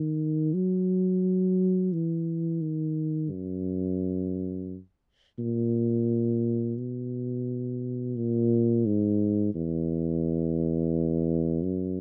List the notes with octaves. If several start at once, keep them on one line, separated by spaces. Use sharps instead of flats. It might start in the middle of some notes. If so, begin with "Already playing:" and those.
Already playing: D#3
F#3
E3
D#3
F#2
A#2
B2
A#2
G#2
E2
F#2